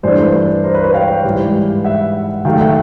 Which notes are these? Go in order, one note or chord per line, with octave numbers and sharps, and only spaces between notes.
G2 E3 A3 D4 C5 D5
A#4 C5
B4 C#5
B4 C#5
F5 G5
G#2 E3 G3
E5 F#5
D#3 F#3 A3 F5 G5
E5 F#5